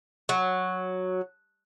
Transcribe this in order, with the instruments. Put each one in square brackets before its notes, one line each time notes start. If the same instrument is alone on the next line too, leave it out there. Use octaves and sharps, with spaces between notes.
[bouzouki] F#3